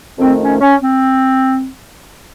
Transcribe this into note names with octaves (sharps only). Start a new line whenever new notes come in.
F2 D#3 A3 C4
C#4
C#4
C4